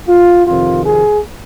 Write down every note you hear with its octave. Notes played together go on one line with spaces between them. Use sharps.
F4
F2 C3 D#3 F4
G#4